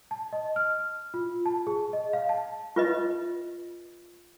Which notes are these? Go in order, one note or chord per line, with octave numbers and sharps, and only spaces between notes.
A5
D#5
F6
F4
A5
G#4
D#5
F5
A5
F4 B4 D#5